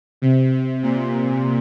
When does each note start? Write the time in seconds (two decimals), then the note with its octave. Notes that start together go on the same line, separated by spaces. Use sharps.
0.22 C3
0.52 C3
0.83 A#2